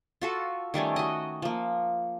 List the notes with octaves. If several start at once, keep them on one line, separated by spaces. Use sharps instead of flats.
F4 F#4 A4
D#3 G3 A3 C#4
F#4 D#5
F3 A#3